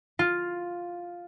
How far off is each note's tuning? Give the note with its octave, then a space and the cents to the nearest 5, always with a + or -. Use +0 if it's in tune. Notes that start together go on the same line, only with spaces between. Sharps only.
F4 +5